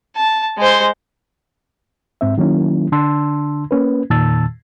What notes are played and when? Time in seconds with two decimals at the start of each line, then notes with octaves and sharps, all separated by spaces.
0.16 A5
0.57 G#3 C5
2.21 G#2 C4 E5
2.38 D#3 F#3 A#3 C#4 E4
2.92 D3 D4 A5 C6 E6
3.71 A#3 C#4 B4
4.10 E2 A#2 D#3 A5 E6 A6